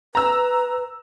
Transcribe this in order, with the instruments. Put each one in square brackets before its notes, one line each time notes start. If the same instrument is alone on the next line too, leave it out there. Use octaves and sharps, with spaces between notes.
[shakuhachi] B4 [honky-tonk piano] A#5 E6